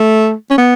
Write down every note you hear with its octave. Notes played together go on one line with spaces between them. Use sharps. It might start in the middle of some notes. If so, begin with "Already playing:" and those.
Already playing: A3
C#4
B3